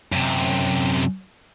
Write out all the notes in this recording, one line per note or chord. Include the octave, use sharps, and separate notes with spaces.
F#2 C3